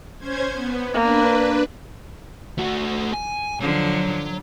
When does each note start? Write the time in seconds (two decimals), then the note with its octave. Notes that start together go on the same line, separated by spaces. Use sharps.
0.18 C#4 C5 G#6
0.53 B3
0.93 A#3 D4 B4
2.58 A3 F#4
3.14 G#5
3.60 D3 F3 F#3